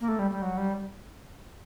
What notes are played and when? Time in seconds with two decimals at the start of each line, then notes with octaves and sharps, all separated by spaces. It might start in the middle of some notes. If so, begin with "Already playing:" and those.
0.01 A#3
0.08 A3
0.19 G3
0.31 G3
0.42 F#3
0.57 G3